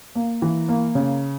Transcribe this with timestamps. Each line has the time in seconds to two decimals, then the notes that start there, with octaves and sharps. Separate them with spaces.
0.15 A#3
0.42 E3
0.69 A#3
0.95 C#3